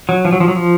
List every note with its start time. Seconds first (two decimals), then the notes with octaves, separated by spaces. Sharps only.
0.09 F#3
0.25 F3
0.32 F#3
0.40 F3
0.48 F#3
0.56 F3